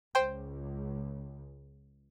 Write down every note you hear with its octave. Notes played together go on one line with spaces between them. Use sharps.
C#2 C5 G5